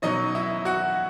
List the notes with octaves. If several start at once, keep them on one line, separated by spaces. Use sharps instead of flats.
B2 F#3 C#4 D#4 D#5
E4 E5
F#4 F#5